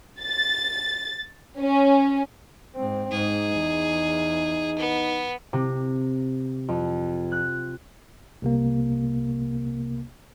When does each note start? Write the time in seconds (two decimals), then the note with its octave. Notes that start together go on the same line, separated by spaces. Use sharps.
0.21 A6
1.59 C#4
2.76 G#2 C4
3.11 G#2 D#4 G#4
3.55 E2
4.78 B3
5.53 C3
6.68 F2
7.32 F#6
8.42 C2 C3 A#3